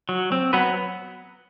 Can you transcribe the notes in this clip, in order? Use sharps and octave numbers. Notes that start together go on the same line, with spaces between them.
F#3
C4
F#3 B3 B4